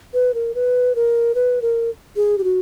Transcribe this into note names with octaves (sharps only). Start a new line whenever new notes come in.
B4
A#4
B4
A#4
B4
A#4
G#4
G4
F#4